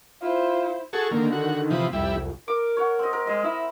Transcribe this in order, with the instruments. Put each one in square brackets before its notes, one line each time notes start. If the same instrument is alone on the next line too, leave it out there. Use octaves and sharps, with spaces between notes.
[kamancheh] E4 C5 [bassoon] F4
[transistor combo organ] F#4 G#4 A4 [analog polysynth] C#6
[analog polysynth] D3 D#3 [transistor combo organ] A#3
[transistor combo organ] F#4
[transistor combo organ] C3 E3 F3 [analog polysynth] B5 D#6
[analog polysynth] C2 F2 [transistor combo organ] G3 E4
[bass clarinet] A#4 [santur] D6
[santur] C#5 F#5
C4 D#5
A#4
[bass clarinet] G#3 [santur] D#5
[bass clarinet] E4 [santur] E5